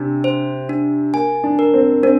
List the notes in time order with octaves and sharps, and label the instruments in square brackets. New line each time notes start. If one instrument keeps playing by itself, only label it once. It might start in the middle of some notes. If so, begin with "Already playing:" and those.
Already playing: [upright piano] C3 [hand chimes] D4
[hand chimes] C5
D4
[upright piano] A#3 [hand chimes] G#5
[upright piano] D4
[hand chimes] A#4
[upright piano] C4
[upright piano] C4 [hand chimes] D4